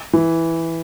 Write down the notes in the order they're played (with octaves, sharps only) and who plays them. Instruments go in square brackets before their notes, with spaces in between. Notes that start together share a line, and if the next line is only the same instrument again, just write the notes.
[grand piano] E3